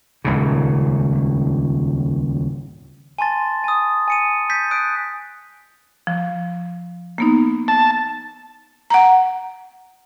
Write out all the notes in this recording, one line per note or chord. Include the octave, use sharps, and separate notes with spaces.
D#1 C#2 G#2 C#3
G#5 A5 C6 A6
G#5 D#6
G#5 C#7 D#7
G6 A6 B6
D#6 F#6 D7
F3
A#3 B3 D#4
A5
F#5 A#5